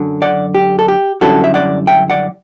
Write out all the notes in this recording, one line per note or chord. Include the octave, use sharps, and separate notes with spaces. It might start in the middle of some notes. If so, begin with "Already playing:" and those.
Already playing: F#2 D3 F#3
D5 F#5
G4
A4
G4
F#2 D3 G3 C#4 E4 F#4 A4
E5
D5 F#5
E5 G5
D5 F#5